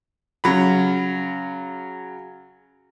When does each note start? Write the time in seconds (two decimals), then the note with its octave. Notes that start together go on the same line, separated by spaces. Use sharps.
0.44 C#3 F#3 B5